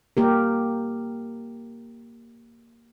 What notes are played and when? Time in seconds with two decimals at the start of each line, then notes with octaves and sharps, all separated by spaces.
0.17 A#3 G4 A#4